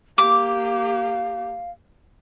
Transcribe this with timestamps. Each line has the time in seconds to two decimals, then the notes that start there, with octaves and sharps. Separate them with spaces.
0.18 A#3 G4 F5 D6